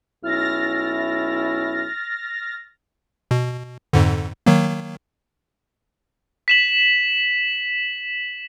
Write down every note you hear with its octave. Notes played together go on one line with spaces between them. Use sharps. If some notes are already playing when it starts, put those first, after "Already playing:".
B1 C#4 E4 F6 A6 A#6
B2
F2 G#2 D3
D#3 F#3 A#3
B6 E7 F#7